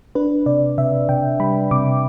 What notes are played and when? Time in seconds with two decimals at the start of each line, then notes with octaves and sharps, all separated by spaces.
0.15 D4 B4
0.46 C3 D5
0.78 C3 E5
1.09 C3 G5
1.40 G3 B5
1.71 C3 D6